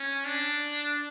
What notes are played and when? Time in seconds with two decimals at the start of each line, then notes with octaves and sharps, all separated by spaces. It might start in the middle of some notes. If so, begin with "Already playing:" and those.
Already playing: C#4
0.25 D4